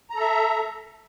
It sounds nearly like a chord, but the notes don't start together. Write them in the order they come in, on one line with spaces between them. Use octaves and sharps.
A#5 A4 E5